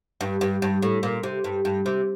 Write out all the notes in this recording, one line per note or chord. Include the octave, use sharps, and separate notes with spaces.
G2
G2
G2
A2
A#2
C3
G2
G2
C3